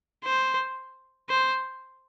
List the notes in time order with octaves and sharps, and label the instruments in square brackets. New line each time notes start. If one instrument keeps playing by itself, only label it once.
[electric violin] C5
C5